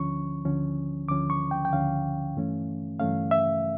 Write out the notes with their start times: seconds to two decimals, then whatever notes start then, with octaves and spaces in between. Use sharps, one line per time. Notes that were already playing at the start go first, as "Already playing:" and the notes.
Already playing: D2 D3 F3 C#4 C#6
0.45 D2 D3 F3 C#4
1.09 D2 D3 F3 C#4 D6
1.30 C#6
1.51 G5
1.65 G5
1.73 D2 D3 F3 C#4 F5
2.36 G2 E3 A3 C#4
3.00 G2 E3 A3 C#4 F5
3.31 E5